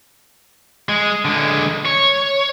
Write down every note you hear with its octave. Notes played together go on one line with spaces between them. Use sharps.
G#3
D3 G#3
C#5